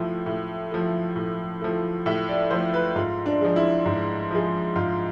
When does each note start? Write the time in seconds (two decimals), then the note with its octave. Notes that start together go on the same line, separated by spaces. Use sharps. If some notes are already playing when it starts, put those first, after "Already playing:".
Already playing: A2 F3 A3
0.26 A2
0.72 F3 A3
1.16 A2
1.61 F3 A3
2.06 A2 E5
2.29 D5
2.51 F3 A3 C5
2.74 B4
2.96 G#2 F4
3.26 D4
3.41 F3 G#3
3.56 E4
3.86 G#2
4.31 F3 G#3
4.76 G#2 F4